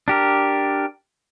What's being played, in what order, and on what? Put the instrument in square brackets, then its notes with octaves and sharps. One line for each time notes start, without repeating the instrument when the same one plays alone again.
[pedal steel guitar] D4 G4 A#4